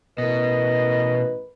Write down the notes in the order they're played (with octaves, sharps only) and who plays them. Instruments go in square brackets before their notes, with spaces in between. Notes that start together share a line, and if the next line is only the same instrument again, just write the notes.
[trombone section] A1 E3 A#4 [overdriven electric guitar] B2 [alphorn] B4 [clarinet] D#5